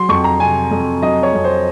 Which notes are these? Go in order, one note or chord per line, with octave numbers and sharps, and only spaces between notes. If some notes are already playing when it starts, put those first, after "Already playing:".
Already playing: F#3 C6
F2 C#6
A#5
C3 G#5
F2
F#3 D#5
C#5
F2
C5